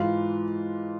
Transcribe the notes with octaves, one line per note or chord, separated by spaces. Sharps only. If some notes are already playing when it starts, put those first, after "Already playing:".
Already playing: G#2 E3 F4